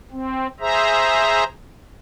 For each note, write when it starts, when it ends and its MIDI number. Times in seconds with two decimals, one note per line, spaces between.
0.12 0.47 60
0.60 1.44 68
0.60 1.44 72
0.60 1.44 76
0.60 1.44 82